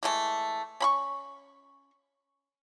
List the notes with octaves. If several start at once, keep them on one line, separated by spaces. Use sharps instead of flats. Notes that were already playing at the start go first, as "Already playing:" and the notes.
E3 G#3 A3
C#4 B5 C#6